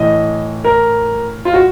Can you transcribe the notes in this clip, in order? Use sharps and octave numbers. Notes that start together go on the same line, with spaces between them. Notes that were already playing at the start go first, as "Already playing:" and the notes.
Already playing: A2 E3 D#5
A#4
F4
F#4